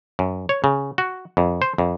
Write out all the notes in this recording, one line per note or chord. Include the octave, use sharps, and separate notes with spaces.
F#2
C#5
C#3
F#4
F2
C5
F2